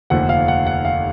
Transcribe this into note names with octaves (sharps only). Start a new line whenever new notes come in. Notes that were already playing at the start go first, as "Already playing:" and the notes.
F1 D#2 D3 F3 F#5
F5
F#5
F#5
F5